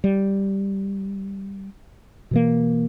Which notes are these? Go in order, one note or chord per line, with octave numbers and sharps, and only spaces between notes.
G3
B2 E3 A#3